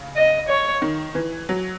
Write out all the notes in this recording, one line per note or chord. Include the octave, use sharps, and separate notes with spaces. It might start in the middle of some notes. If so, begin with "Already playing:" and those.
Already playing: C#3
D#5
C#5
D#3
E3
F#3